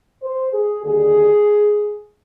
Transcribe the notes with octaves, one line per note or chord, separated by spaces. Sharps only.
C5
G#4
D#2 D3 G3 G#4